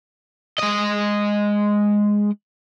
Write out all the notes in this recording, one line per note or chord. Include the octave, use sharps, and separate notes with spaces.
G#3 D#5